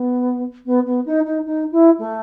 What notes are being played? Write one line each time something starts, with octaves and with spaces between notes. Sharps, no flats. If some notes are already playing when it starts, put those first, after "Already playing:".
Already playing: B3
B3
B3
D#4
D#4
D#4
E4
A3